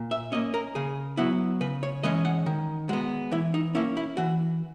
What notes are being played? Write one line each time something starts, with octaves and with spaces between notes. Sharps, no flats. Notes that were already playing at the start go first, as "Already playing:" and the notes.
Already playing: A#2
E5
A#3 C#4 D#5
A#4
C#3 G#4
F#3 B3 E4
C#3 B4
C#5
E3 G#3 C#4 D#5
F#5
D#3
G#3 B3 F#4
E3 E4
D#4
A#3 C#4 E4
E4
E3 F#4